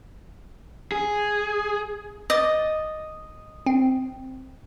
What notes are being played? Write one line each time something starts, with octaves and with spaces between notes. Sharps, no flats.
G#4
D#5 D6 D#6 A6
C4